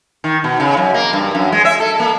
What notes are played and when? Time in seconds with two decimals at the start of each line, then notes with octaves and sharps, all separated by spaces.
0.24 D#3
0.44 B2
0.60 C#3
0.77 F#2
0.94 A#3
1.13 G2
1.35 F#2
1.52 G#3
1.65 E5
1.80 A4
2.00 A#3